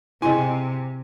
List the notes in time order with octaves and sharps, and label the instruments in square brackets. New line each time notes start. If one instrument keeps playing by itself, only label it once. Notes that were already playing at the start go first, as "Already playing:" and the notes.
[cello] C3 [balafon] E4 G#4 D#5 [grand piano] G#5 C6